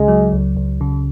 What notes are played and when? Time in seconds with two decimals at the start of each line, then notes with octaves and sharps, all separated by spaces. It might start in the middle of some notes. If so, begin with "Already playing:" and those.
Already playing: C#2 C#3 G#3
0.08 F#3
0.33 C#2
0.57 C#2
0.81 C#3